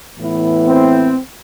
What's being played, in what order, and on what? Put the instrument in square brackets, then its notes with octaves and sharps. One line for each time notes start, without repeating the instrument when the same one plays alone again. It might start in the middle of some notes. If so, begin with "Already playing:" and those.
[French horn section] A2 E3 B3 E4
[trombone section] C4